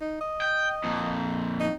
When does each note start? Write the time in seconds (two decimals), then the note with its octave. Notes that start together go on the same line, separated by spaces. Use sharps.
0.01 D#4
0.21 D#5
0.42 G5
0.84 F2 A#2
1.60 D#4